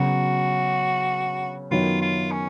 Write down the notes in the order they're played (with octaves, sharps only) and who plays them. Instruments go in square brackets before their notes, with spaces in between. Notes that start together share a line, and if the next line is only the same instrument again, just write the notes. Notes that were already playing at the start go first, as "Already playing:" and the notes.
Already playing: [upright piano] C#3 F#3 B3 [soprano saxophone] F#4
[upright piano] F#2 D#3 F#3 B3 [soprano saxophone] F4
[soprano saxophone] F4
C#4